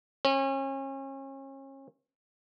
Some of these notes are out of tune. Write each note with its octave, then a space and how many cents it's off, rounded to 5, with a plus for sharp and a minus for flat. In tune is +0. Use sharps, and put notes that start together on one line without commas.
C#4 -35